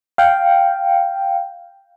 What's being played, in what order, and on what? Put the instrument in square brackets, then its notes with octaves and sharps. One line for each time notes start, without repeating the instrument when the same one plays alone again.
[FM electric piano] F5 G5